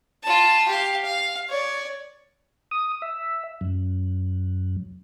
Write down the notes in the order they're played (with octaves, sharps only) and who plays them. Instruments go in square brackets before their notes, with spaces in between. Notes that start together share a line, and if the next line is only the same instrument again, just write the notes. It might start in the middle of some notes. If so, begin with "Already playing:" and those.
[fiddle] F4 A5
G4 F5
F5
C#5 D5
[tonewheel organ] D#6
E5
F#2